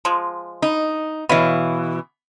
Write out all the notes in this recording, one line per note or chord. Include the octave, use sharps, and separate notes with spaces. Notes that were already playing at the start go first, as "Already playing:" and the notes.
F3 G#3
D#4
B2 E3 B4 C#5 F5